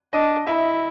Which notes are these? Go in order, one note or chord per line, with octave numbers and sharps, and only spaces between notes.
D4 D#5
E4 E5